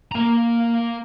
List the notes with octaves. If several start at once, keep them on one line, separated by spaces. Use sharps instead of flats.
A#3 A#5